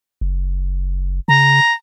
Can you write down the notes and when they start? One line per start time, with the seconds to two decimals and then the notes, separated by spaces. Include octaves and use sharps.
0.21 F#1
1.28 C#3 A#5